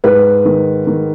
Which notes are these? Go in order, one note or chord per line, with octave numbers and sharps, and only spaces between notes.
G#2 B4
D#3
D#3